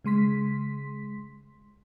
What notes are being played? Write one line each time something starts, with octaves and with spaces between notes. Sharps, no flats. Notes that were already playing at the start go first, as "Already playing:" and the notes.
C#3 G#3 C6 B6